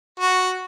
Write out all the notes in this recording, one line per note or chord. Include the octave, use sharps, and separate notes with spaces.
F#4